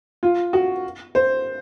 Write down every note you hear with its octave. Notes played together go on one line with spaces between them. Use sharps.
F4
F#4
C5